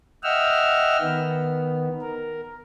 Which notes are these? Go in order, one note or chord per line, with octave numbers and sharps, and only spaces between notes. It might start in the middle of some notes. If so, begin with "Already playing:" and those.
D#5 E5 F#5 G5 E6 F6
D#3 B3
A#4